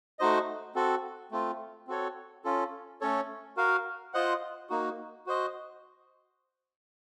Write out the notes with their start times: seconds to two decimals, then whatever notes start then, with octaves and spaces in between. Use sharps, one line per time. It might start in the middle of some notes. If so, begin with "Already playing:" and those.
0.19 A3 D#4 F#4 C5 D#5
0.75 C4 F#4 A4
1.31 A3 C4 F4
1.87 C4 F#4 A4 C#5
2.44 C#4 F4 A4
3.01 A3 C#4 A4 C#5
3.57 F#4 A#4 F5
4.14 F4 C5 D#5 F#5
4.70 A#3 D#4 F#4
5.26 F#4 C5 D#5